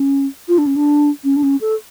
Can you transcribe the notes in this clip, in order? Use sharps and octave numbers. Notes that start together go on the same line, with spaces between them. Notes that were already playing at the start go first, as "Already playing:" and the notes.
Already playing: C#4
F4
D4
C#4
D4
C#4
D4
C#4
A4